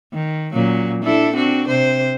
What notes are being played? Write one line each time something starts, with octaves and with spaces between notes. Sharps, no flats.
D#3
A#2 F#3 C#4
D4 E4 A4
C4 D4 F#4
C3 C5